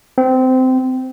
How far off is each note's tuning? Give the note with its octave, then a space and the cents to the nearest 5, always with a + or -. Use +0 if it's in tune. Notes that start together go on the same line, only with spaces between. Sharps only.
C4 -20